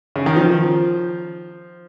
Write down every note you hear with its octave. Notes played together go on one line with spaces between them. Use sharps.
C#3
D#3
F3